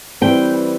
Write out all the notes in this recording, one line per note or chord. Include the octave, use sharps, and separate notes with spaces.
E3 G3 C4 G5